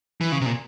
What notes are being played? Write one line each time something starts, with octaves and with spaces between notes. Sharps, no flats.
E3
C#3
C3
A#2